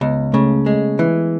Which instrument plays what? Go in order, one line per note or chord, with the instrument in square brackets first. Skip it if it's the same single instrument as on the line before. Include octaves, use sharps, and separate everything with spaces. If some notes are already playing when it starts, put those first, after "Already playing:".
[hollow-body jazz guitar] C#2 [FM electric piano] B3
[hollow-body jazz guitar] C#3 [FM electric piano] A3
[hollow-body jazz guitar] G#3 [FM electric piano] A3
[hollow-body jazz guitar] E3